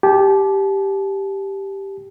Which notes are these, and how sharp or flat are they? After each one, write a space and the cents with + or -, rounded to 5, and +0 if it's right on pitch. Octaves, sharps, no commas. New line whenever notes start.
G4 +0 A5 -35